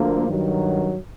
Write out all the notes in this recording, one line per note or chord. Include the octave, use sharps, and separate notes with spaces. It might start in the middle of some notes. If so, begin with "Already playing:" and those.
Already playing: D2 D3 F3 A#3
G2 D#3 F#3